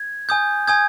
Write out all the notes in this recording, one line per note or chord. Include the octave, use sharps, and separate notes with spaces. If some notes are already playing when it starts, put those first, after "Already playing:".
Already playing: G#6
G#5 D#6 G6
G#5 D#6 G6 G#6